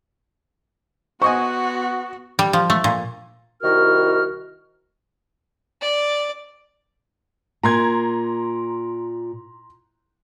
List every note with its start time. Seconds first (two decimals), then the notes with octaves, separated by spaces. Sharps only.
1.22 B3 F#4 C5 D#5 G#5 C#6
2.39 G3
2.53 F3
2.70 A3
2.84 A#2
3.63 C2 D#3 E4 F#4 A#4 F6
5.81 D5
7.63 A#2 A#5 C6 G#6